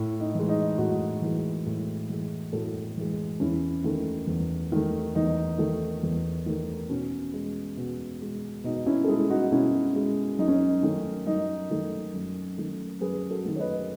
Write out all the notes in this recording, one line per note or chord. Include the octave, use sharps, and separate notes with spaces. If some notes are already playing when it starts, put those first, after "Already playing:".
Already playing: A2
D#4
E3 G#3
D#4
A2 D#4 F#4
E3 G#3
A2
E3 G#3
A2 F#4 A4
E3 G#3
E2 C#4 E4
D#3 A3
E2
D#3 A3
E2 D#4
D#3 A3
E2
D#3 A3
B2 C#4
G#3
B2
G#3
B2 D#4
C#4 E4
A4
G#3 E4 G#4
D#4 F#4
B2 C#4 E4
G#3
F#2 D#4
C#4
D#4
D#3 A3 C#4
F#2 D#4
D#3 A3
F#2
D#3 A3
F#2 G#4 B4
F#4 A4
D#3 A3
C#5
B4 D#5